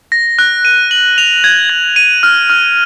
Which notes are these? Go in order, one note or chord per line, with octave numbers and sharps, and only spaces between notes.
A#6
F#6
D#7
F#7
F7
G#6
G#6
D#7
F6
F6